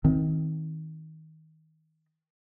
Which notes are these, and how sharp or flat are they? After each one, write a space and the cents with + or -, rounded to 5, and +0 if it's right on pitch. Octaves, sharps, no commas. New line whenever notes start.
D#3 +25 C4 +0